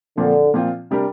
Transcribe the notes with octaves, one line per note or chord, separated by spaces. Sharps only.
A#2 D3 F3 C4
A#2 F3 C4 F4
C3 G3 D4 G4 A#4